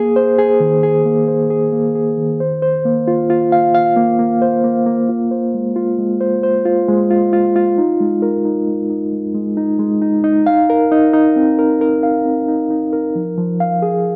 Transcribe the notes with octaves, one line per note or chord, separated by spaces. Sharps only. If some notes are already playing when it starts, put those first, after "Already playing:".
Already playing: A#3 G#4
C5
G#4
D#3
G#4
A#3
C5
G#4
A#3
G#4
D#3
C5
C5
A#3
F4
F4
F5
F5
A#3
A#3
C5
A#3
A#3
F4
C5
G#3
F4
G#3
C5
C5
F4
G#3
F4
F4
F4
D#4
G#3
A#4
D#4
G#3
D#4
G#3
G#3
D#4
G#3
D#4
D#4
F5
A#4
D#4
D#4
C4
A#4
A#4
F5
C4
D#4
D#4
A#4
F3
F3
F5
G#4